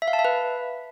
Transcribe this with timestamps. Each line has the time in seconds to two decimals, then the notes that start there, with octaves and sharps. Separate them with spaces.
0.02 E5
0.08 F5
0.13 A5
0.19 E5
0.25 B4